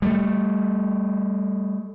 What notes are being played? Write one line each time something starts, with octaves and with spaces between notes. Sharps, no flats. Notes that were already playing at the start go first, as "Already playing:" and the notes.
G3 A3